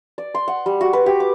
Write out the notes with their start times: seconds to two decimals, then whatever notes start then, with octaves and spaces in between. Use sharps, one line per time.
0.18 D5
0.34 C6
0.48 F#5
0.66 G3
0.81 F#4
0.93 B4
1.06 G4
1.20 D6